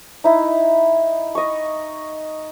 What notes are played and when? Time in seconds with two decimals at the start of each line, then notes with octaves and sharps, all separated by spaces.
0.24 D#4 E4
1.35 D#5 C#6